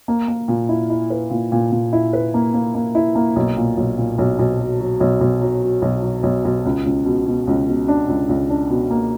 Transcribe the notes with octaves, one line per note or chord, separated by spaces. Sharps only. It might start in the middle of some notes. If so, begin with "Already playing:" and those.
A#3
A#3
A#2
E4
E4
B4
A#2
A#2
A#2
E4
B4
A#3
A#3
A#3
E4
A#3
B1
A#2
B1
A#2
B1
B1
F#3
F#3
B1
B1
F#3
F#3
B1
F#3
B1
B1
C#2
C#2
B2
B2
C#2
B2
D4
C#2
C#2
D4
B2
A#3